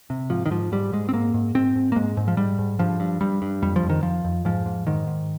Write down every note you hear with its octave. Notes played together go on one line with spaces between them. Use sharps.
C3
G#2 F3
D#3
G#2 F3
G#2 G3
G#2 G#3
C4
G#2 A#3
G#2
G#2 C4
G#2
A#3
G#2 G#3
G#2
F3
G#2 G3
G#2
G2 F3
G2
G2 G3
G2
F2 G3
F3
F2
D#3
F2 F3
F2
G#2 F3
G#2
G#2 D#3
G#2